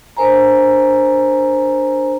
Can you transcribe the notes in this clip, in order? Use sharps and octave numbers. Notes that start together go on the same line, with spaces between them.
D4 A#4 C5 G#5 A#5